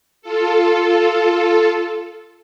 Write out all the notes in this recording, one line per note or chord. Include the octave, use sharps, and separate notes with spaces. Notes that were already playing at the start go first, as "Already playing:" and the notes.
F4 A4